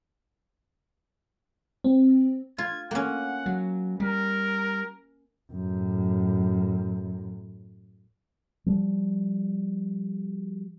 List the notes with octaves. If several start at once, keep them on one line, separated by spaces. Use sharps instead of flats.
C4
F4 G#6
A#3 C#4 F#5
F#3
G3 A#4
F#2 A2
F3 G3